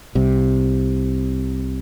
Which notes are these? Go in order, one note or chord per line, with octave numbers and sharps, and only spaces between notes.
C2 C3